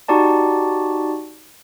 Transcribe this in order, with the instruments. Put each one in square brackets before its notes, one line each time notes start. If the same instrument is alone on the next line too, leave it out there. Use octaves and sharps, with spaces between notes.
[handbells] D#4 F#4 G4 D5 A5